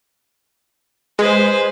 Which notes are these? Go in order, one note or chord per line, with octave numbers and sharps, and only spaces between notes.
G#3 B4 C5